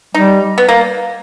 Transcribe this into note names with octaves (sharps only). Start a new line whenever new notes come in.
G3 D#4
B3
A#3